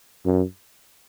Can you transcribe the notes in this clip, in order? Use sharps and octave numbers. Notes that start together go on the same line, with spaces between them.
F#2